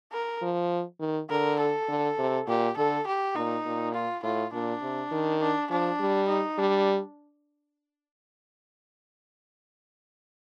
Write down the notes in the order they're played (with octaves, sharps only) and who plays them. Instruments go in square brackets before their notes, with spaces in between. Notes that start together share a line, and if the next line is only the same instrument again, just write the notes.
[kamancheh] A#4
[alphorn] F3
D#3
[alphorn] D3 [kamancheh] A#4
[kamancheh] A4
[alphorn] D3
C3
[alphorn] A#2 [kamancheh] G4
[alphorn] D3 [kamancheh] A4
[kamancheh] G4
[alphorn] A#2 [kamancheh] D#4
[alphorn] A#2
[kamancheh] F4
[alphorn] A2 [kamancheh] F4
[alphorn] A#2 [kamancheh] D4
[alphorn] C3
D#3
[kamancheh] D4
[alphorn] F3 [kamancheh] D4
[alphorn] G3
[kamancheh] D#4
[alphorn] G3 [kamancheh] D4